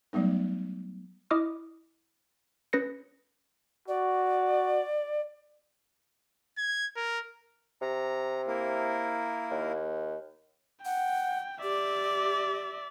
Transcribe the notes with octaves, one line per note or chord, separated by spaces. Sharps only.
F#3 G3 A3 B3 D#4
E4 D#5 D6 D#6 F6
C#4 B4 A#6 C#7
F#4 D5
G#6
A#4
C3 A#5
A#3 E4 A#4
D#2
F#5 G5
G4 D5 E5